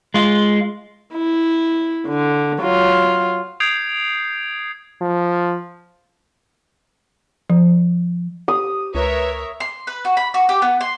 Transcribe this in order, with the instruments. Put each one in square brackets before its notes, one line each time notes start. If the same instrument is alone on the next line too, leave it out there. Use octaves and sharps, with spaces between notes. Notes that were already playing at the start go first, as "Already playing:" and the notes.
[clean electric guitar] G#3 F4
[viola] E4
D3
F#3 F4
[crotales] D#6 G6 G#6 C7 D7 F7
[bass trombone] F3
[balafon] F3
[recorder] G4 [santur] D#6
[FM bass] C#2 [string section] A#4 C#5 E5 [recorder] B4
[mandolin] C6
B4
F#4
B5
F#4
G4
B3
C6